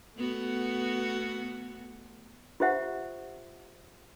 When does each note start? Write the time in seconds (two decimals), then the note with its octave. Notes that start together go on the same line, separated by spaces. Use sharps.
0.16 A3 B3 F#4
2.60 F4 G4 C5 E5 F#5